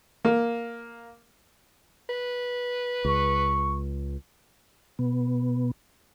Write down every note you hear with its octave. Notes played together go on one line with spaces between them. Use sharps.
A#3
B4
C#2 C#6
B2 B3